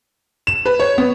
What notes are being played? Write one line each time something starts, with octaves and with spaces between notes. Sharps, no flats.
E7
B4
C#5
B3